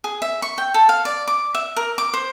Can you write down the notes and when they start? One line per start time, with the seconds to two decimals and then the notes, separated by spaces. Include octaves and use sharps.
0.04 G#4
0.22 E5
0.42 C#6
0.58 G5
0.74 A4
0.89 F5
1.05 D5
1.28 D6
1.55 E5
1.76 A#4
1.98 D6
2.14 C5